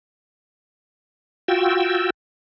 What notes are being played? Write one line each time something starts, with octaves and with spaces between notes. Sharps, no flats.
F4 F#4 G5 E6